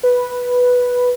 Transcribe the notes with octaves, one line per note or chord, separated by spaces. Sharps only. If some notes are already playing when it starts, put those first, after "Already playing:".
B4